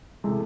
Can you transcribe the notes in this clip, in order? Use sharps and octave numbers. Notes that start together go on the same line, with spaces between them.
C3 E3 G#3 A3